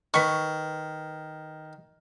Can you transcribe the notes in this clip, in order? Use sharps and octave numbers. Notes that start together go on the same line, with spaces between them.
D#3 B4 C#6